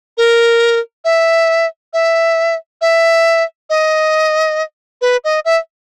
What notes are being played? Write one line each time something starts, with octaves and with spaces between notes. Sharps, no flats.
A#4
E5
E5
E5
D#5
B4
D#5
E5